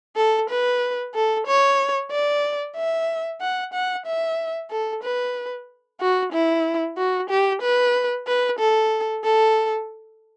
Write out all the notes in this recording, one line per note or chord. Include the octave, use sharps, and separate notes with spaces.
A4
B4
A4
C#5
D5
E5
F#5
F#5
E5
A4
B4
F#4
E4
F#4
G4
B4
B4
A4
A4